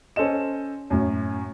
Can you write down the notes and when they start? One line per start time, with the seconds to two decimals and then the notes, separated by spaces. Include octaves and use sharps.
0.16 C#4 A4 C5 D#5 E7
0.90 F#2 A2